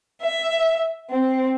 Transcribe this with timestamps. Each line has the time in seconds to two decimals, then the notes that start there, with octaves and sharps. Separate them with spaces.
0.21 E5
1.11 C4